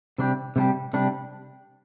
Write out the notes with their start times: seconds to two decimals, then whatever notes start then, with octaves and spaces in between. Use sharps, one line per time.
0.18 C3 G3 D4 G4
0.56 C3 G3 D4 G4
0.93 C3 G3 D4 G4